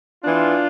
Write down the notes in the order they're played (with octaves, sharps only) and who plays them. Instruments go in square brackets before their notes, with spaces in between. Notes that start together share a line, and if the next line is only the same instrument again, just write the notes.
[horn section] E3 B3 D4 F4